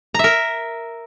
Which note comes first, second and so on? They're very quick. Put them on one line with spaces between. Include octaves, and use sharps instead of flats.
A#5 E5 A#4